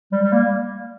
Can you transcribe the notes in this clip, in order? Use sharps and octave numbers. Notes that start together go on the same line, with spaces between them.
G3
G3
A#3